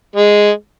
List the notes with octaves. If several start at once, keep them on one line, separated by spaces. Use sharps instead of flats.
G#3